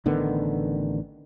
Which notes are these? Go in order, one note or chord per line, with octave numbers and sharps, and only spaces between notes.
A1 D3 D#3 B3